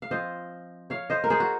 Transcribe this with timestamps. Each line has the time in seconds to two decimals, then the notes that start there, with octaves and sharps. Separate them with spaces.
0.02 F5
0.10 F3 C4 F4 C5 D#5
0.90 C#5 F5
1.10 C5 D#5
1.24 A#4
1.30 G#4 C5
1.40 F#4